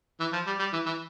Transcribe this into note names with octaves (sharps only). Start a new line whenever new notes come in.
E3
F3
G3
G3
E3
E3